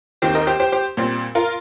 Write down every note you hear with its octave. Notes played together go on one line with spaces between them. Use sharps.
D#2 D#3 C4 G4 C5
A#4 D#5
G4 C5
G4 C5
G4 C5
A#2 G3 C4
F4 A#4